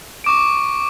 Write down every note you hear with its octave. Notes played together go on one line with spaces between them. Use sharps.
C#6 D6 D7